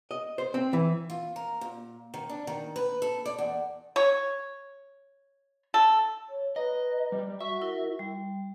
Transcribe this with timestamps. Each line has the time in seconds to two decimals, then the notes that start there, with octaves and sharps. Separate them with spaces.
0.11 D#5
0.38 C5
0.54 C4
0.73 E3
1.10 F4
1.36 A#4
1.61 A#2
2.14 D#3
2.30 D4
2.47 D#3
2.76 B4
3.02 A4
3.26 D5
3.38 E2
3.96 C#5
5.74 A4
6.30 C#5
6.56 B4 D#5 A#5
7.12 G3
7.40 F#4 E5 C#6
7.61 E4 A#4 E6
7.99 G3